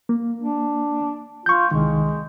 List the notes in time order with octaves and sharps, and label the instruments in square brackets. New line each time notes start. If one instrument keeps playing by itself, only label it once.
[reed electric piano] A#3
[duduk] D4
[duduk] F4 [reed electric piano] C#6 G6
[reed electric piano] C2 D#3 [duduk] G#3